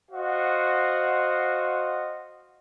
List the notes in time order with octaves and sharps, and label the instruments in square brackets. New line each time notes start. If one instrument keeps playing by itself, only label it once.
[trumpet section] F#4 C5 D#5 F5 F#5